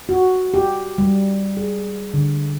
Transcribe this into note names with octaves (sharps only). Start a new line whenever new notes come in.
F#4
G4
G3
G#4
D3